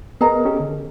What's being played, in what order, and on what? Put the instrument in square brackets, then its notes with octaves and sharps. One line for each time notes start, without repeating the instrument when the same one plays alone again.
[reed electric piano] B3 A#4 [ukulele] G#4 D#5 A#5
[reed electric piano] C#4 G4 A4
D3